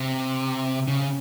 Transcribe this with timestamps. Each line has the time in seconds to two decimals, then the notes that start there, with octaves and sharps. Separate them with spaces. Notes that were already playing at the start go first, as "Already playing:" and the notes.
Already playing: C3
0.88 C#3